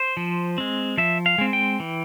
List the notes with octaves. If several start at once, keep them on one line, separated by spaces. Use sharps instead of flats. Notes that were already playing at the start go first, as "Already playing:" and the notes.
Already playing: C5
F3
G#3 C4
F3 E5
F5
G#3 C4
G5
E3